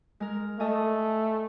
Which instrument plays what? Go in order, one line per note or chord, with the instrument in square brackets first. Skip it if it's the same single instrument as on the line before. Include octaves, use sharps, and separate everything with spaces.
[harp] G#3 A#4
[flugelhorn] A3 [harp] A4 D#5 G#5